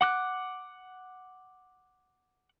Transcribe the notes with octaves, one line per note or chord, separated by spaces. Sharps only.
F#5 D6 F#6